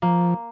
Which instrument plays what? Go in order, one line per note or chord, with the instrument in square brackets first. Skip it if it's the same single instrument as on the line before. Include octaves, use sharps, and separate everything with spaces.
[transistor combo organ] F3 [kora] A#3